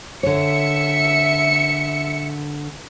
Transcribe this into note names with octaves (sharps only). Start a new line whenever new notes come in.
D3 C#5 E5 C#7